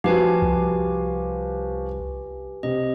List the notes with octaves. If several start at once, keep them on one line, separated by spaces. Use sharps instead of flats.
F3 F#4 G4 B4 G#5
C2
C3 D#5